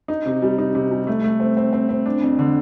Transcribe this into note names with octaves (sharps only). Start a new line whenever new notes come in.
D#4
C3
G3
D#4
C3
G3
A3
A3
C4
C4
C4
C4
D4
F2
D3